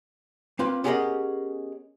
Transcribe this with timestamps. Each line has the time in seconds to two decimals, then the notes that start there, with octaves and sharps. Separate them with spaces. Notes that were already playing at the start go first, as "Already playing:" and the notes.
0.59 A#3 C4 F4 B4
0.84 B3 C#4 G4 G#4 A#4 D#5